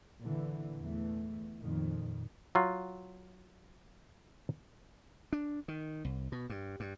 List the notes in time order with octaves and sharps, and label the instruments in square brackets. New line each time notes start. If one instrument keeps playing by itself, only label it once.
[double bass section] A#2 D3 E3
E2 E3 A3
F2 A#2 D#3
[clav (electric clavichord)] F#3 F4
[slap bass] D4
D#3
C2
B2
G2
G2